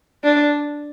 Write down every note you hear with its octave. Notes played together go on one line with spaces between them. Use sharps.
D4